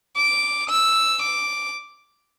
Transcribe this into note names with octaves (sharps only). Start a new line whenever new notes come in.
D6
E6
D6